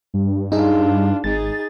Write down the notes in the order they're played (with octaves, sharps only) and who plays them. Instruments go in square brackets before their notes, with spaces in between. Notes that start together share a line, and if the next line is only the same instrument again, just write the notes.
[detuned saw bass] G2
[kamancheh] D4 F4 [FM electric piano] D#4 G#4
[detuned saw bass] G#1 [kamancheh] D#4 G#4 [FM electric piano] A6